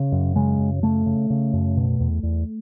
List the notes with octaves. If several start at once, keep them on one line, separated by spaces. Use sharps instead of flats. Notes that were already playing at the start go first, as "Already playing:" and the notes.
Already playing: C#3
F#2
C#3 G#3
F#2
C#3 A3
C#3
C#3
F#2
B2
E2
E2